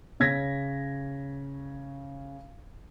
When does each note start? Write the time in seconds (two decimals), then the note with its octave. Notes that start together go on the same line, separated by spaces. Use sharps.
0.20 C#3 C#5 G#6 A#6 B6